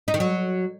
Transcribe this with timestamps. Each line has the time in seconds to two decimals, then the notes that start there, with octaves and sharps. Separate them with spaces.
0.08 D#4
0.14 D#3
0.20 F#3